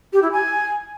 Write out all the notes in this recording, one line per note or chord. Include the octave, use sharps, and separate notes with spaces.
G4
E4
G#5